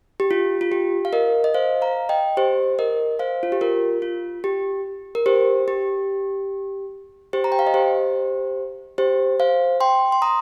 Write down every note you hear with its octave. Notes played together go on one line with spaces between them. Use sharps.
G4
F4
F4
G4
F5
A#4 D#5
D#5
C5 F5
F5 A#5
D#5 G5
G4 C5
A#4 D#5
C5 F5
F4
G4
F4 A#4
F4
G4
A#4
G4 C5
G4
G4 C5
A#5
G5
F5
D#5
G4 C5
G4 C5
C5 F5
G5 C6
C6
A#5 D#6